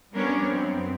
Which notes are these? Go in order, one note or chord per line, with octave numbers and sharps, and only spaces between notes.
G3 B3 C#4 D4 A#4 C#5
F#2 B3 C4